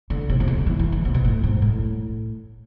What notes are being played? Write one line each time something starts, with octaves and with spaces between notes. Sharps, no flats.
D3
C3
C3
D3
E3
E3
D3
C3
B2
A2
G#2
A2